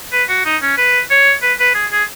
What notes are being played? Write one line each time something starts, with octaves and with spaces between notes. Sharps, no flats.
B4
F#4
D#4
C#4
B4
C#5
B4
B4
G#4
G#4